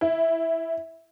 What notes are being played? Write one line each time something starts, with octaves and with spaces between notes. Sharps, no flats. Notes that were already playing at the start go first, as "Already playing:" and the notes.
E4